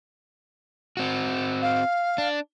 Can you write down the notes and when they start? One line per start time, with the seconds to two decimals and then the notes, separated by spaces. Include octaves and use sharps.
0.97 C4 F#4
1.62 F5
2.18 D4